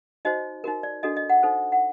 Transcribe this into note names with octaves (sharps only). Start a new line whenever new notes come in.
D#4 F#4 C5 D#5
D#4 F#4 A#4
D5
D4 F#4 A4 D#5
D#5
F#5
D#4 A4 C5
F#5